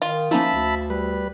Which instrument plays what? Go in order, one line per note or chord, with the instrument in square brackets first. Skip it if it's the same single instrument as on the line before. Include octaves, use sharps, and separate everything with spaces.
[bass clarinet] D#3 [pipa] F4
[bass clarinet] F3 [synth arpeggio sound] A#3 C#4 D#4 [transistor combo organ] E5 A5 B5
[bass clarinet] D2
[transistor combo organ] G3 B4